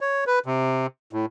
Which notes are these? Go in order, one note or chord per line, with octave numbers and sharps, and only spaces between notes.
C#5
B4
C3
A2